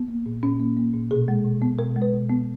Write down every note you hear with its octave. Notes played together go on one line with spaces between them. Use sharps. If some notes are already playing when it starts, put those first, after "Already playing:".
Already playing: B3
A#3
A#2
A#2 C#4
A#3
A#3
A#2
B2 G#4
G#3
B2
B3
B2 A#4
G#3
B4
B2
B3